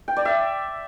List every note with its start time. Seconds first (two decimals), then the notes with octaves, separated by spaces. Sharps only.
0.08 G5
0.17 D5
0.25 E5